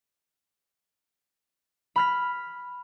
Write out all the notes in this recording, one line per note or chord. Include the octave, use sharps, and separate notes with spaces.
B5 F6 B6